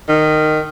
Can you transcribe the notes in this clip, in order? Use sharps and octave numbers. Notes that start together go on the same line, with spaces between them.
D#3